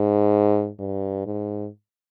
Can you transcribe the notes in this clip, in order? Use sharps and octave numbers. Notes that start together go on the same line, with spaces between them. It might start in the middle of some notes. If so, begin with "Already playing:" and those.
Already playing: G#2
G2
G#2